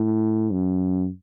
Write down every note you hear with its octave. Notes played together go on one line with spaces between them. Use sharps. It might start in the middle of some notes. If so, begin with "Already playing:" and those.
Already playing: A2
F#2